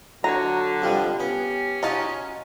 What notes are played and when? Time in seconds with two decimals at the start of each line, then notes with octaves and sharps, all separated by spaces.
0.24 D3 F#3 C#5 A#5
0.82 F2 F3 G3 G4
1.20 B3 C#4
1.83 D#4 F4 F#4 D#5 A5